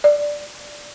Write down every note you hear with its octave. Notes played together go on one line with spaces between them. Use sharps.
D5